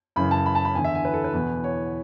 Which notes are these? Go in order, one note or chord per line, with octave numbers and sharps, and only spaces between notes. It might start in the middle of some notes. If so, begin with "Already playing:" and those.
F#2 C#3 E3 B5
A5
B5
A5
B5
E2 D3 G#5
E5
G#5
B4
A4
B4
E2 B2
C#5